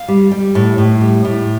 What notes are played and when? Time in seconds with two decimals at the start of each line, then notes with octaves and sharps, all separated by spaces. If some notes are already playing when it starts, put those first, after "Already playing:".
Already playing: F5
0.08 G3
0.31 G3
0.55 A2
0.78 A2
1.01 G3
1.25 A2